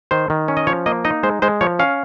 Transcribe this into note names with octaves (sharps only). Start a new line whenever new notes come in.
D#3 C5
D#3
C#4
D#5
F3 C#5
A#3 D#5
D#4 D#5
G#3 C5
G#3 C5
F3 C#5
C#4 F5